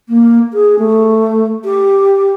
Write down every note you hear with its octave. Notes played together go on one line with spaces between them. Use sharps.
A#3
G#4
A3
G4